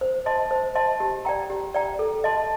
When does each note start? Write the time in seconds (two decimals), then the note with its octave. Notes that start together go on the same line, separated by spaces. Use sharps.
0.01 C5
0.26 D#5 A5 C6
0.51 C5
0.75 D#5 A5 C6
1.00 G4
1.25 D5 G5 A#5
1.50 G4
1.75 D5 G5 A#5
1.99 A4
2.24 D#5 A5 C6